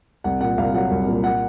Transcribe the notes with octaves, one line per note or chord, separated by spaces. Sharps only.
C2 F#5
A#2 F#5
C2 F5
F#3 F#5
C2
A#2
F#5